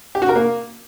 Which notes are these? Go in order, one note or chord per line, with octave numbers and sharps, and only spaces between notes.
G4
F#4
A#4
A#3